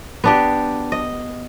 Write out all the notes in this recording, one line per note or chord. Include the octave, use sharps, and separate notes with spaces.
B3 D4 G4
D#5